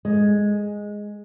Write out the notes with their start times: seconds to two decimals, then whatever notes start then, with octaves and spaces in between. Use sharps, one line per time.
0.05 G#3